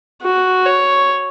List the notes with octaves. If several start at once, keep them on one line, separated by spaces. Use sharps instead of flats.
F#4
C#5